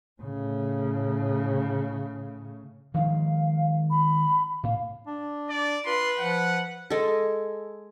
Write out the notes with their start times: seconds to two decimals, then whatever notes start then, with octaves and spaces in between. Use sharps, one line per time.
0.22 A2 C#3
2.94 D#3 F3 G#3 F5
3.90 B5
4.63 A2 F5
5.07 D4
5.49 D5
5.86 F4 B4 C6
6.19 F3 F#5
6.90 G#3 A4